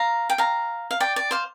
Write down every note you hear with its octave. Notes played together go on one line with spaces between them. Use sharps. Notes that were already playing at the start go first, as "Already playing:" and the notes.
Already playing: F5 A#5
G5
F5 A#5
F5
D5 G5
D5
C5 F5